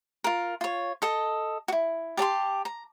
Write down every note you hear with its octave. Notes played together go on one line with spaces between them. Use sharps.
F4 A#4
F4 C#5
A4 D#5
E4 F#4
G4 D5 A5 C6
A#5